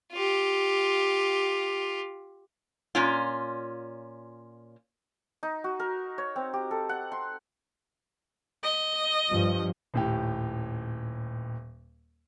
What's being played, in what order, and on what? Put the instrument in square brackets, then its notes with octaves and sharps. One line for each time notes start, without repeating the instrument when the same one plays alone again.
[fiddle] F4 G4
[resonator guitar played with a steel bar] A#2 C#4 F4
[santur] D#4
F#4
A#4
C#5
C4
G4
A4
F#5
C6
[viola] D#5
[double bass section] G2 F3
[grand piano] D#1 A2 G4